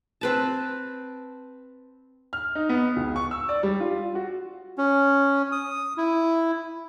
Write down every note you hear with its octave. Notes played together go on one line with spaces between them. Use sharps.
C4 B4 A5
F6
D#4
B3
C#2
C#6
E6
D5
G3
F4
F#4
C#4
D#6
E4